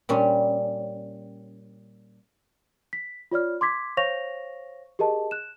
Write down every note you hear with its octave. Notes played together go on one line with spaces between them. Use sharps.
A#2 G3 C#4
B6
F4 C#5 D5 F6
C6 D6 G#6 B6
C5 C#5 F5 C#6 A#6 F7
G4 G#4 A#4 D#5 A5
F#6 E7